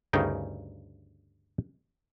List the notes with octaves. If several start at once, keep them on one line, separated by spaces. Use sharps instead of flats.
D2 G2 C#3 D#4 G#4 G5